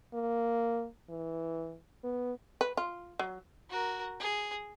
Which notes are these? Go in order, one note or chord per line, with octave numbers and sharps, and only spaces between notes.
A#3
E3
B3
B4
F4
F#3
F#4 A#4
G#4